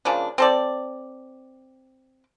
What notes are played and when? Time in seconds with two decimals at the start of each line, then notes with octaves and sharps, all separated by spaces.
0.05 C#3 F3 A#3 D4
0.38 C4 A4 D5